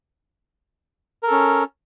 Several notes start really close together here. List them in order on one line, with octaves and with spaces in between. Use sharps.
A#4 A4 C#4